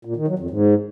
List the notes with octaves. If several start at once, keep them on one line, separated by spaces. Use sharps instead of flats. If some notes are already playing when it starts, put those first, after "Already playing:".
A#2
D#3
F#3
F2
G#2